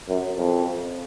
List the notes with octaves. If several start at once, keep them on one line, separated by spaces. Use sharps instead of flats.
F#2
F2